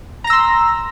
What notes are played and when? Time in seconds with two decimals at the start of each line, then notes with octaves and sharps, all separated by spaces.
0.24 A#5
0.27 A#6
0.30 E6
0.33 C6